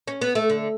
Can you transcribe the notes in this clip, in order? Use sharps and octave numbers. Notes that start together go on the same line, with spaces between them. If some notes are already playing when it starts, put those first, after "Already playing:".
C#4
B3
A3
D3